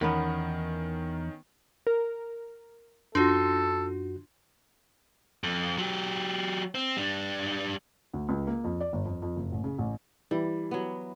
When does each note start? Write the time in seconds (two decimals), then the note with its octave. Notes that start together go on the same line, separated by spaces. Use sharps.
0.01 E2 D#3 B3 C#4 A#4 B4 F#5
1.87 A#4
3.15 F#2 D4 F4 F#4 A4 C6
5.44 F2
5.78 F#3 G4
6.75 C4
6.97 G3 D4
8.13 D2
8.29 C#2
8.47 A#3
8.64 F2
8.80 D5
8.93 G1
9.05 F2
9.22 F2
9.36 F#1
9.52 A1
9.64 C#3
9.79 A1
10.31 E3 G3
10.71 F#3 B3